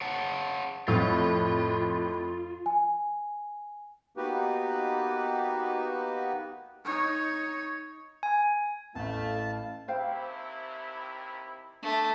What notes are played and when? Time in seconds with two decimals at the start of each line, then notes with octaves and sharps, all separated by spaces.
0.01 C#5 F#5 A5
0.88 F2 A2 F4
2.66 G#5
4.17 A#3 B3 D#4 F#4 G4 B4
6.85 D#4 C#5
8.23 G#5
8.95 A1 A3 E4 F5 A5
9.88 D#2 C3 E4 C5 F5 G5
11.82 A3 D4